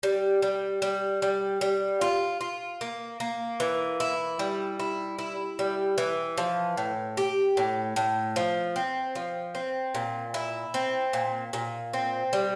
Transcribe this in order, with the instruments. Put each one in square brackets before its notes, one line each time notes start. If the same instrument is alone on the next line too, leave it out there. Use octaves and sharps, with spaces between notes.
[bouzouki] G3
G3
G3
G3
G3
F4
F4
A#3
A#3
E3
E4
G3
E4
E4
G3
E3
F3
A2
G4
A2
A2
F3
C4
F3
C4
A#2
E4
C4
A#2
A#2
C4
G3